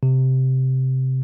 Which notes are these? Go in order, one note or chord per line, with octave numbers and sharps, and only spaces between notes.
C3